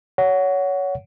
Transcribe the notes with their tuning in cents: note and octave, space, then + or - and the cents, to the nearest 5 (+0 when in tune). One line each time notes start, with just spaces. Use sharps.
C#5 +20 F#5 +0